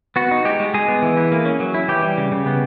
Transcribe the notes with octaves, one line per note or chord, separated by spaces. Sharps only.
B3 F#4
D#4
G#3 G4
G#3
G#3 G#4
B3
E3
E4
A#3
C#4
F#3
E4
E3 G4
G3
C#3
C#3
B3